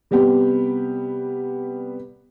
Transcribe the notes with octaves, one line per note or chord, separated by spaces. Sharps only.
C3 G3 B3 G4